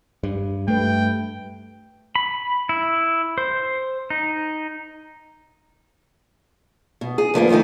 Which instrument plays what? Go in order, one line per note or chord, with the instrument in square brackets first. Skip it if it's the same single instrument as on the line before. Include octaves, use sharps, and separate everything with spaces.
[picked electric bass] G2
[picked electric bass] G2 [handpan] A3 B4 [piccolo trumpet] G5
[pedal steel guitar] B5
E4
C5
D#4
[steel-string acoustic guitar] B2
G#4
D2 F3 A#3 B3
F#2 D#3 F3 A3 D#4